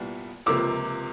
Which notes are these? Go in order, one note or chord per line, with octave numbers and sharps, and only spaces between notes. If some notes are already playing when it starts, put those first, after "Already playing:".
Already playing: C2 A#2 G3 B3
C#2 C3 F3 A#3 D6 E6